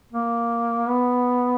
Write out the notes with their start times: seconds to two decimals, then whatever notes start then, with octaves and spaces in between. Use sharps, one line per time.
0.13 A#3
0.89 B3